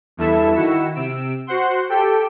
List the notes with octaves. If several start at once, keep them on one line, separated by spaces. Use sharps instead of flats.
E2 G2 E4 A4 E5 E7
D#3 E4 F#4 E6 C#7
C3 E6 D7
F#4 C5 F#5 C6
G4 A4 G5